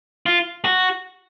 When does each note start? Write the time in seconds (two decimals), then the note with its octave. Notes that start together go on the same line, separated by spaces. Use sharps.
0.26 F4
0.65 F#4